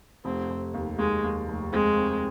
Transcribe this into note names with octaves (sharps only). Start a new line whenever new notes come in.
F1 C4
F1
D#2
D#2 G#3
D#2
F1
G#3 C4
C4